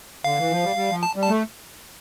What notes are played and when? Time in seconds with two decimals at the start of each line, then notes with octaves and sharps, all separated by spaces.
0.24 D3 F5
0.38 E3
0.51 F3
0.64 G3
0.76 G3
0.91 F3
1.03 A5
1.16 G3
1.23 A5
1.29 A3